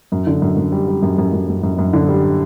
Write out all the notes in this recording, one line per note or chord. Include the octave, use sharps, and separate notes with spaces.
F#2
D3
F#2
F#2
G3
G3
F#2
F#2
F#2
F#2
F#2
F#2
D3
G3